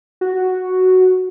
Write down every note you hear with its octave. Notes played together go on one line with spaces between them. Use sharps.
F#4